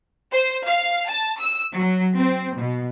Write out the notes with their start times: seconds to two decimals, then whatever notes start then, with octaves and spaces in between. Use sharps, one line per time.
0.31 C5
0.66 F5
1.08 A5
1.39 E6
1.73 F#3
2.15 C4
2.59 B2